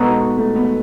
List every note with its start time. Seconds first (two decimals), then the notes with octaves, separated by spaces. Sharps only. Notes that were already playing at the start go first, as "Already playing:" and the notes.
Already playing: B2 G#3 B3 D#4 F#4 A4
0.37 A3
0.56 B3